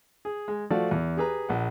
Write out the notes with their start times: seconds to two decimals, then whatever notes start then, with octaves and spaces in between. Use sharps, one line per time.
0.25 G#4
0.48 G#3
0.70 F3 A3 F#4 D5 F5
0.91 E2
1.17 G4 G#4 B4 A#5
1.49 A#1 F#5